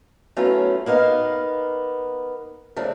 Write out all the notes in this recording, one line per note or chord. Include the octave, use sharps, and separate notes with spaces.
F#3 A3 B3 C#4 E4 F4
A#3 B3 D#4 F5
C#3 F3 A3 D4